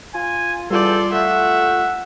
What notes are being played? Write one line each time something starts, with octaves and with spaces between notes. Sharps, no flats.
F4 G#5
E2 G3 F4 A4 D5 C6 G6
A3 E5 F#5